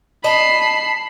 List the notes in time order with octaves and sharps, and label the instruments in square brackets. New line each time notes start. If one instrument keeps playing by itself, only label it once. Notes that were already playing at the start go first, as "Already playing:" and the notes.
[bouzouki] D#5 [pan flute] A5 [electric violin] B5 C7